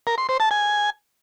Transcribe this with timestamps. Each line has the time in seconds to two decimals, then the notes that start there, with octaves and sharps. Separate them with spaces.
0.07 A#4
0.18 C6
0.29 C5
0.40 A5
0.51 G#5